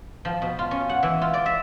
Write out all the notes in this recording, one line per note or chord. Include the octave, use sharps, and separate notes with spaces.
F3
B2
F4
C#4
F#5
E3
F4
D5
E5